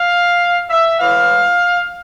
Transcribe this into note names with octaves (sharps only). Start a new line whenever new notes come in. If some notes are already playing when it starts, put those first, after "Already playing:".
Already playing: F5
E5
A2 E3 G#3 F5